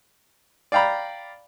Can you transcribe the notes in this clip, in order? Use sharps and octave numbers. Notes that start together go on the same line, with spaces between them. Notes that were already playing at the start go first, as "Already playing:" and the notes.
D5 F5 G5 A#5 B5